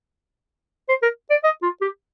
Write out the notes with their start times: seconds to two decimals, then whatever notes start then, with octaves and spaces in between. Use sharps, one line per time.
0.89 C5
1.03 A#4
1.30 D5
1.44 D#5
1.62 F4
1.81 G4